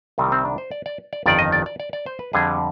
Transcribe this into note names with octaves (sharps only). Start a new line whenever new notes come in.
C2 C3 D#3 G3 C4
C4
D4
C5
D5
D5
D5
G1 F2 D#3 D5
D#5
D5
D5
D5
D5
C5
B4
F2 D3 G3 G#4